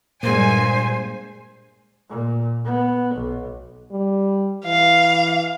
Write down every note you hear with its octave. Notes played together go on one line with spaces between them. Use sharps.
G2 A#2 G#3 A#3 C5 G#5
A#2
B3
B1
G3
E3 F5